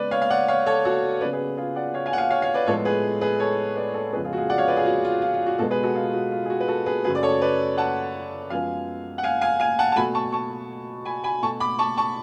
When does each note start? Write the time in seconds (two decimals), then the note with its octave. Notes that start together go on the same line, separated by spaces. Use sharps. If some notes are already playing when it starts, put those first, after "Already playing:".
Already playing: C#3 G#3 B3 B4 D5
0.11 C#5 F5
0.22 F5
0.30 D5 F#5
0.48 C#5 F5
0.66 A4 C#5
0.85 F#4 A4
1.21 C#3 F#3 B3 B4 D5
1.33 G#4 B4
1.57 F4 G#4
1.75 D5 F#5
1.94 C#5 F5
2.06 F5 G#5
2.13 F#5
2.18 F5 G#5
2.30 C#5 F5
2.42 C#5 F5
2.54 B4 D5
2.66 A2 F3 G#3 B3 A4 C#5
2.85 G#4 B4
3.21 G#4 B4
3.40 A4 C#5
3.76 B4 D5
3.94 A4 C#5
4.13 F2 C#3 G#3 B3 G#4 B4
4.24 F4 G#4
4.33 F#4
4.37 F4 G#4
4.50 D5 F#5
4.58 C#5 F5
4.68 B4 D5
4.76 F4 G#4
4.86 F#4
5.05 F4
5.22 F4
5.34 F4
5.46 F#4
5.58 B2 G#3 B3 F#4 A4
5.70 G#4 B4
5.83 F#4 A4
5.95 F4 G#4
6.14 F#4
6.31 F4
6.45 G#4
6.50 F#4
6.60 B4
6.68 F#4 A4
6.86 G#4 B4
7.04 F#2 C#3 F#3 A3 G#4 B4
7.15 D5
7.23 A4 C#5
7.42 B4 D5
7.77 F#5 A5
8.50 F#2 F3 G#3 B3 F5 G#5
9.18 F#5
9.23 F5 G#5
9.41 F5 G#5
9.60 F5 G#5
9.79 F#5 A5
9.92 A5
9.96 B2 F#3 A3 G#5 B5
10.15 A5 C#6
10.32 A5 C#6
11.05 G#5 B5
11.24 G#5 B5
11.42 B2 A3 A5 C#6
11.60 B5 D6
11.79 A5 C#6
11.97 A5 C#6